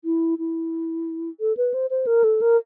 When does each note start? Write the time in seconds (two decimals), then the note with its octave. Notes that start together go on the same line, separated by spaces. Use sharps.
0.05 E4
0.39 E4
1.40 A4
1.57 B4
1.74 C5
1.90 C5
2.07 A#4
2.24 A4
2.42 A#4